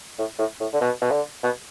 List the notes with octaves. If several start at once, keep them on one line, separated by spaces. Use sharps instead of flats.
A2
A2
A2
D3
B2
B2
D3
B2